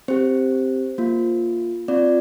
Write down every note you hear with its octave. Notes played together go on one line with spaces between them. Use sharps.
C4 G4 C5
A#3 F4
C4 F4 D5